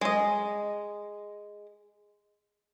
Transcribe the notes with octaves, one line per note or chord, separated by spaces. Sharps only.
G#3 D#5